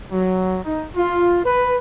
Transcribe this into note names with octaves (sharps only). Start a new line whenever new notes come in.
F#3
D#4
F4
B4